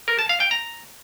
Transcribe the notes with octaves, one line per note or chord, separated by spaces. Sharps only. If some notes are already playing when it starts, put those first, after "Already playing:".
A#4
A5
F5
G5
A#5